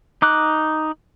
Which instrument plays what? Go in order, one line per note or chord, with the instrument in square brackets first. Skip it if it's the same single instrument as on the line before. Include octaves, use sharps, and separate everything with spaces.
[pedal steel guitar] D#4 D6 F#6